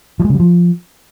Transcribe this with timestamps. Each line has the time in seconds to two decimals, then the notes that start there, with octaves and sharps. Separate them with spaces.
0.20 F3
0.25 G#3
0.30 C#3
0.35 G3
0.40 F3